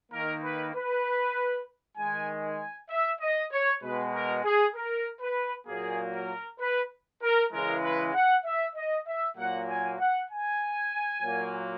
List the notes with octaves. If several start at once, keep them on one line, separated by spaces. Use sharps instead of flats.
D#3 A#3 A#4
B4
B4
D#3 G#3 G#5
G#5
E5
D#5
C#5
B2 G#3 B4
A#4
G#4
A#4
B4
A#2 F#3 A#3 G#4
A#4
B4
A#4
C#3 E3 G#3 A#4
B4
F#5
E5
D#5
E5
A#2 F#3 A#3 F#5
G#5
F#5
G#5
A#2 F#3 A#3